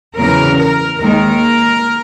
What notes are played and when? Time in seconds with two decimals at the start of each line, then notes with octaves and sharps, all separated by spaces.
0.17 E2 C#3 F#3 A#4
0.58 A#4
0.99 D#2 D#3 G#3 A#4